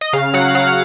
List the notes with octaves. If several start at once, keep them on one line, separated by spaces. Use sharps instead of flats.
D#5
C#3 F5
F#3 F#5
F#3 F5